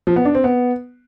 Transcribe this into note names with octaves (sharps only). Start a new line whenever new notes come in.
F3
B3
D4
C4
B3